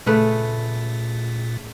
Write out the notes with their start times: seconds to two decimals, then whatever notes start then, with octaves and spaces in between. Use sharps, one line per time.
0.06 A#2 C#3 A3 B4